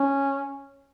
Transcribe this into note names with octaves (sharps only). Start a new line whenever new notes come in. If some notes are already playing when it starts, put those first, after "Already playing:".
Already playing: C#4